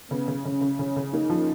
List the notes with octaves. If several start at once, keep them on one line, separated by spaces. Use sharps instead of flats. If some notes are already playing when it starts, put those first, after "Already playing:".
C#3 B3
C#3
C#3 C#4
C#3
C#3 C#4
C#3
A#3 D#4
F3